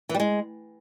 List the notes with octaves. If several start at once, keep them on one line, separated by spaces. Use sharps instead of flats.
E3
G3
G#3